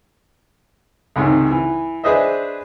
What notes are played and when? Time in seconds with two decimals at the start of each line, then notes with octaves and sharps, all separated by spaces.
1.16 C#2 G#2 C3 D#3
1.51 E3
2.04 D4 G#4 B4 C5 D#5 E5